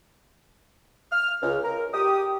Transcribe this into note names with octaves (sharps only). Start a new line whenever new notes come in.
F6
C#2
A#4
G4 D#6